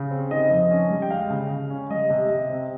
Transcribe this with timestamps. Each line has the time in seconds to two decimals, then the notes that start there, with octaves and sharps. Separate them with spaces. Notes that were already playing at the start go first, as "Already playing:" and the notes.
Already playing: C#3
0.11 C4
0.31 D#3 D#5
0.51 F2
0.71 C#4
0.90 G3
1.02 G5
1.10 G#3 F5
1.30 C#3
1.50 C#3
1.70 C#4
1.90 G3 D#5
2.10 C3
2.30 C3
2.50 C4